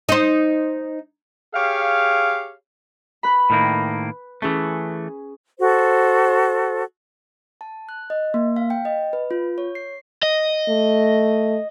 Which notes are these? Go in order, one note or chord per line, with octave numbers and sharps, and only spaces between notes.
D#4 C5
G4 G#4 C#5 F5
B4 B5
A2 D#3 A#3
E3 A3 C#4 G#4
F#4 A4 C5
A5
F#6
D#5
A#3
F5
G5
D#5
B4
F4
C#5
C7
D#5
A3